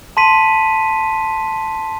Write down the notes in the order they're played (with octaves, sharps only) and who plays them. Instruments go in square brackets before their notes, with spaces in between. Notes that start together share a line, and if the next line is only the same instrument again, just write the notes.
[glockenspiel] A5 C6 B6 D#7